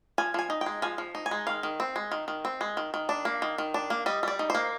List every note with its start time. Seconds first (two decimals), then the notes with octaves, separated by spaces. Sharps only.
0.18 F3 G#5
0.34 F3 G#5
0.50 D#4
0.61 G5
0.66 G#3
0.82 F3 G#5
0.98 F3
1.15 D#4
1.26 G#5
1.31 G#3
1.47 D#3 F5
1.63 D#3
1.80 C4
1.96 G#3
2.12 D#3
2.28 D#3
2.45 C4
2.61 G#3
2.77 D#3
2.94 D#3
3.09 D4
3.25 A#3
3.42 D#3
3.58 D#3
3.74 D4
3.90 A#3
4.06 G3 D#5
4.23 G3 D5
4.39 D#4
4.50 A#3 C5